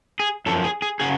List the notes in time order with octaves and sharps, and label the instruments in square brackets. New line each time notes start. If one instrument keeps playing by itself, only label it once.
[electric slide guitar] G#4
F#2 F3 A4
G#4
G#4
C#3 F#3 G#4